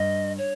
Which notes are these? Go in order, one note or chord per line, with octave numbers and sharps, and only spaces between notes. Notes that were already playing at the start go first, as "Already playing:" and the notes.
Already playing: G2 D#5
C#5